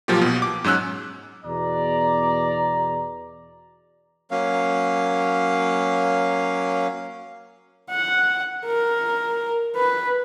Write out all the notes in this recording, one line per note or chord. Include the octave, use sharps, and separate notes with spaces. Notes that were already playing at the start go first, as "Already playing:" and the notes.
A#2 F3 F#3 A#3 F4 G4
B1 B2
D6
G#2 F#3 C#4 E6 F#6
E2 B2 D5 A#5
F#3 A#3 C#4 F5
F#5
A#4
B4